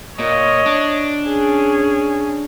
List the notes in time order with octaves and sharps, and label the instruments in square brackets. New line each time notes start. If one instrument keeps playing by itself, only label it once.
[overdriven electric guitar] A#2 [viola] C#5 D#5
[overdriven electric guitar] D4
[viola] C#4 G#4